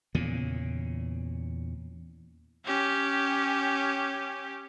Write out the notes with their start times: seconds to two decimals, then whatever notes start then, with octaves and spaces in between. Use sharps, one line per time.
0.15 E2 A#2 C#3
2.65 C#4 G4